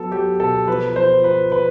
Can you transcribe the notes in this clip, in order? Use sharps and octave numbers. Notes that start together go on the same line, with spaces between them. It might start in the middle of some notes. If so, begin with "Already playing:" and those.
Already playing: F#3 B3 A4
F#3 G4
B2 A4
F3 B4
F3 C5
F3 B4
B4